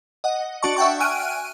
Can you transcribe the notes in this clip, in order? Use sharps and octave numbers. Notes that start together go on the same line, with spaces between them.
D#5 F#5
D4 F#4 D5 A5 C#6
E5 F#5 G5 C#6
G#5 F6 F#6 D7 D#7